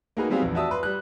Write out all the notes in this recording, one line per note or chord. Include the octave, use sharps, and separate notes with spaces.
A#3 D#4 F#4 G#4 A#4 B4
F#3 G3 B3 C4 G#4 F5
A#1 E2
F#4 D5 E5 A5 D#6 E6
B4 C6
G3 F#6